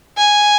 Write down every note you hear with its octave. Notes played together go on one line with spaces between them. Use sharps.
G#5